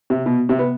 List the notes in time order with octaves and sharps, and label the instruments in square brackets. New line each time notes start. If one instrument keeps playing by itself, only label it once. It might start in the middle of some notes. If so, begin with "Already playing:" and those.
[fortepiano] C3
B2
C3
B3